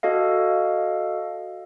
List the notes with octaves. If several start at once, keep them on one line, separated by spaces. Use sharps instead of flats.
F#4 A4 D#5 F5